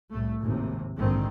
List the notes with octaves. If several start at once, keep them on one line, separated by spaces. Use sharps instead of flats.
C2 A2 A3
G#1 D#2 A2 C3
A#1 G#2 D3 D#3 C4